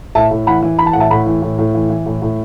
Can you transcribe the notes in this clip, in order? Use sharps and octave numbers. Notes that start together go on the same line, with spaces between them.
A2 E5 A5
A2
E3 F#5 B5
E3
E3 B5
A5
A2 F#5
E5 A5
A2 F#5 B5
E3
A2
A2
E3
E3
A2
A2